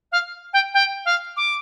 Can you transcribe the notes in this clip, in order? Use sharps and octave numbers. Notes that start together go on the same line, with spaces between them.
F5
G5
G5
F5
D6